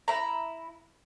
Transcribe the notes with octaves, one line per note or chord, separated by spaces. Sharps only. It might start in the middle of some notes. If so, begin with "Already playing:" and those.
E4 A#5